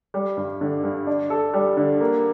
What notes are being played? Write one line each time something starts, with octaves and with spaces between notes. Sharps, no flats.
G3
G2
D3
G2
D4
A4
G3
D3
A#3